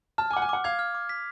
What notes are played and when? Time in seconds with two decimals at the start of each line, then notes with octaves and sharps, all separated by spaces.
0.18 A5 F6
0.31 G#5
0.33 F#5 D6
0.42 G#5
0.49 F#5 D6
0.64 F5 G#6
0.79 F6
0.95 D6
1.09 B6